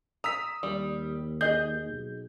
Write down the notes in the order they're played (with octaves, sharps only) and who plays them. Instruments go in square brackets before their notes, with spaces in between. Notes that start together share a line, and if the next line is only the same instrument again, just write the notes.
[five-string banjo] A#5 [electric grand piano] D#6 E6 B6
[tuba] D#2 [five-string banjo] G3
[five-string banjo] G#4 D#5 [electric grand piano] G6
[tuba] B1